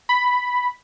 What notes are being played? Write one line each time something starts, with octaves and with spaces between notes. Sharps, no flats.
B5